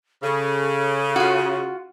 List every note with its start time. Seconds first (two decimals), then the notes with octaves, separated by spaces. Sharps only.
0.23 C#3 A4
1.16 F4 F#4